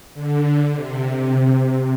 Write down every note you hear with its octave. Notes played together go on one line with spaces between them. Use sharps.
D3
C3